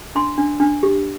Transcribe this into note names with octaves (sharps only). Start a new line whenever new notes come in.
D4 C6
D4
D4
G4